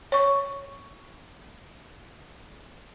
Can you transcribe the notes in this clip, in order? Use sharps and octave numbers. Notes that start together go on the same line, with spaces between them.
C#5 C#6